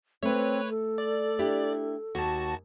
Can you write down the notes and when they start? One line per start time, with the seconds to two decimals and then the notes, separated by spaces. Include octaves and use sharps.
0.23 A3 C4 B4 C#5
0.70 A4
0.98 D5
1.39 D4 E4 G4
2.15 D#2 F#4 A5